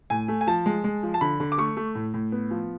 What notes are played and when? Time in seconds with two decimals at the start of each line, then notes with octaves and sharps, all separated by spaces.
0.10 A2 G#5
0.28 A3
0.41 G#5
0.47 F3 A5
0.66 G#3
0.84 G#3
1.03 F3
1.14 A5
1.21 D3 B5
1.40 D3
1.52 D6
1.58 A3 C#6
1.77 A3
1.95 A2
2.14 A2
2.32 B3
2.51 F3